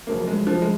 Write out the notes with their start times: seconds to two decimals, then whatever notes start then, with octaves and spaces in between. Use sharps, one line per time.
0.07 F1 F2 C#3 F#3 A#3
0.28 G#3
0.47 F3
0.62 G#3